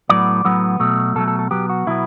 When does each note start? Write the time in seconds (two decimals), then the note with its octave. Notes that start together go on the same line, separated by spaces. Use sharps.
0.09 A2 F#3 B3 D5
0.45 A2 F#3 B3
0.80 B2 F#3 A3
1.16 B2 F#3 A3 A4
1.28 A4
1.39 A4
1.51 B2 F#3 B3 G4
1.69 F#4
1.87 B2 F#3 B3 E4